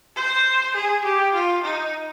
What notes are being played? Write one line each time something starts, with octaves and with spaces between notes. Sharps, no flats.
C5
G#4
G4
F4
D#4